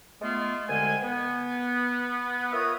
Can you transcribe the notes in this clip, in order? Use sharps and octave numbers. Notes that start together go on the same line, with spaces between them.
G#3 A3 B3 F4
C2 D3 G#3 G5 G#5
B3
F4 A#4 B4 C#5 E5 D#6